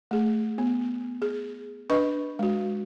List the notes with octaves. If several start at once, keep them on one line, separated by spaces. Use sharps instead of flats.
A3 G#4
B3
G#4
D4 B4 D#5 C#6
G#3 F#4